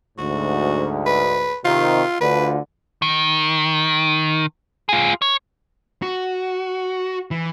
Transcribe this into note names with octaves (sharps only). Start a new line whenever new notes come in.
D2 G#2 F#4
B4
C3 D#3 F4
D2 D3 F4 B4
D#3
F4 G#4
C#5
F#4
E3